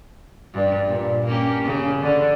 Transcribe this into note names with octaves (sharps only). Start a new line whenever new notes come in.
G2
A#2
A#3 C#4 G4
C#3
D3